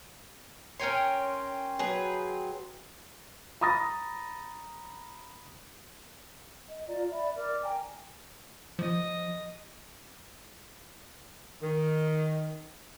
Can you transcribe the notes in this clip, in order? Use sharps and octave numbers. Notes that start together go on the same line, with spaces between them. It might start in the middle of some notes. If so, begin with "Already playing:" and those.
C#4 A#4 C#5 G5 G#5 C6
F#3 G#4 B4
A#5 B5 D#6 A6 A#6
D#5
F4 D5 A#5
D5 E5 B5
A#4 D5 D6 F6
G5 G#5 A#5
F3 D#5
D#3